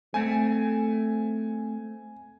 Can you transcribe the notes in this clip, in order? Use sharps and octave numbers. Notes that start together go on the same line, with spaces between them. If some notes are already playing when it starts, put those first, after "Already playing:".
A3 C4 G#5